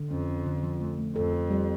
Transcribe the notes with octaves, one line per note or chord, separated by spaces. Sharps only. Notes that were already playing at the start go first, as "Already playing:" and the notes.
Already playing: D3
F2 C#4
C#4
D3
F3
A3
A3
F2 A4
A4
G3